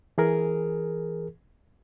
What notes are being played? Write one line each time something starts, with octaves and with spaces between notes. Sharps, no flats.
E3 G#4 A#4